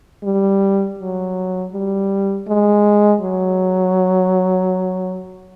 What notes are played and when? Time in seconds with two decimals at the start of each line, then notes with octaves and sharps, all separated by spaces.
0.24 G3
0.99 F#3
1.72 G3
2.48 G#3
3.21 F#3